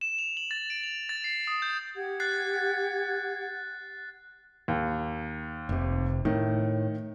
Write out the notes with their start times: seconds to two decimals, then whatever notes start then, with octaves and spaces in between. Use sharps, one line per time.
0.01 E7
0.18 F7
0.37 F#7
0.51 A6
0.70 D7
0.83 F7
1.09 A6
1.24 C7
1.47 D#6
1.62 G6
1.96 G4 F#5 G#6
2.20 F#6 A6 C7
4.68 D#2
5.69 F1 C3
6.25 A2 D#3